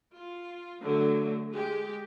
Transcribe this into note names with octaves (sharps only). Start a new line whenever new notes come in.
F4
D3 F#3 A3
G#3 G4